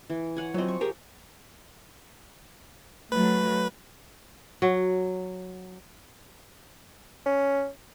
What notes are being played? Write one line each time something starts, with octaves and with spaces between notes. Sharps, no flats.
E3
C#5 F#5 G#5
F3 F#3 C4 D#5
C#6
G4 G#4 A#4
F#3 A3 B4
F#3
C#4